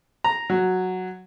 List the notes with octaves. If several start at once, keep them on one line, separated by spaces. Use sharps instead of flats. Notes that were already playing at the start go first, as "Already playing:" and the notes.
A#5
F#3